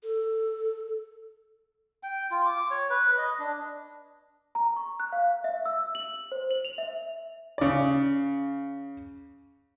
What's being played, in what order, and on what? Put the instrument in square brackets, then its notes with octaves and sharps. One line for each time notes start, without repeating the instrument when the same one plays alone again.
[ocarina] A4
[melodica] G5
F4
D6
C#5
B4
D#5
D4
[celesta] A#5
C#6
F#6
F5
E5
E6
F#7
C5
F#7
F7
E5
[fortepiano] C#3 D5